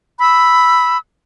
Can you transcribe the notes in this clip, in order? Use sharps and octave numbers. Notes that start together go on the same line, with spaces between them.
B5 E6